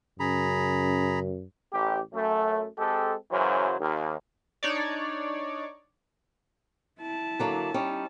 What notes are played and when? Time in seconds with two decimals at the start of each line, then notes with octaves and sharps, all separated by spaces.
0.20 F#2 C#3 G#4 A#5 B5
1.73 A1 G4
2.14 F#2 A3
2.78 G#3 C4 G4 A4
3.31 F#2 C#3 E3 F#3 C5
3.79 D#2
4.63 D4 D#4 C#5 D5
7.00 E4 A5
7.39 D3 F#3 A#3
7.74 G3 C#4 D#4